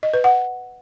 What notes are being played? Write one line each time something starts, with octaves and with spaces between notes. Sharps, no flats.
D#5
B4
F#5